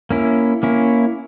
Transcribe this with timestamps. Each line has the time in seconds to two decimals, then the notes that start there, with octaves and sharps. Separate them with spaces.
0.11 A#3 C#4 E4
0.63 A#3 C#4 E4